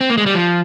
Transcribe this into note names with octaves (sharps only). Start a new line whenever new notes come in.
C4
A#3
G#3
G3
F3